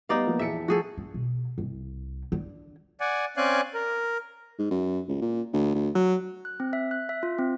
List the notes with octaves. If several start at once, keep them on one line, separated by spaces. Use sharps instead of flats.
G3 B3 D#4 D5 F5
F3 A#3 B3
A#1 E2 A4 E5 C#7
F3 F#4 G#4 A4
D4
B2
C2
D3
D5 F#5 G#5
C4 C#4 D5 F5 G#5 F#6
A#4
G#2
F#2
C#2
A#2
D2
D2
F#3
F#6
C4
E5
F#6
E5
F4
C4